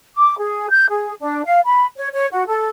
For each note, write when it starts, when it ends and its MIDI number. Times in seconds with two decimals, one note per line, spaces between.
0.15 0.38 86
0.38 0.70 68
0.70 0.86 91
0.89 1.14 68
1.20 1.45 62
1.45 1.59 77
1.65 1.85 83
1.96 2.08 73
2.13 2.27 73
2.31 2.44 66
2.47 2.68 69